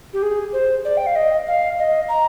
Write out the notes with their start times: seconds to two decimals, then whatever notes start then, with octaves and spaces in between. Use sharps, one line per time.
0.13 G4
0.22 G#4
0.53 C5
0.85 D5
0.97 G5
1.06 F5
1.15 D#5
1.47 F5
1.78 D#5
2.09 A#5